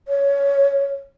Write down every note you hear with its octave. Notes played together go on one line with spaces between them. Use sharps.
C#5